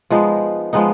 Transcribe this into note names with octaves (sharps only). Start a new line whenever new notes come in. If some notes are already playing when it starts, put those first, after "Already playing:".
F3 G#3 B3 D#4
F3 G#3 B3 D#4